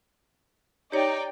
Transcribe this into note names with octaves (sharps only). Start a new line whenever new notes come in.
D#4 G4 C#5 D5 G5